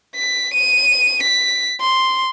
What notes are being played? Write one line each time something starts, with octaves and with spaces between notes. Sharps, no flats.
B6
D#7
B6
C6